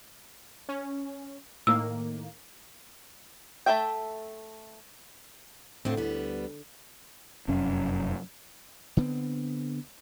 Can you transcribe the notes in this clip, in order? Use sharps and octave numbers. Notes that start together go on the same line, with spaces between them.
C#4
A2 D#3 A#3 E6
A3 D#4 A4 E5 G5
F2 A2 D3 C4
D2 G3 B3
F1 F#2 C#4
D3 B3 C4